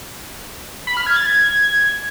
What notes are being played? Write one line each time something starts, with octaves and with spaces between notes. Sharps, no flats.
B5
F6
G#6
A6
G#6